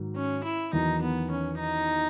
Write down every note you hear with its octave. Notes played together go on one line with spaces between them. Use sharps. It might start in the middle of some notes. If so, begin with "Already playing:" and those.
Already playing: G#2 D#3 F#3
C#4
E4
E2 D#3 F#3 D#4
B3
C#4
D#4